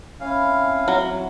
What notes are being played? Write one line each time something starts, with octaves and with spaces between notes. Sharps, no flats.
E3 C#4 F5
C4 E4
F#3